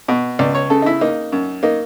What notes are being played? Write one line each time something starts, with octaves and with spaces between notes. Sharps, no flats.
B2
C#2 D5
C#5
C#3 A4
D#4
E4
A#3 D#4
F#2
A#3 D#4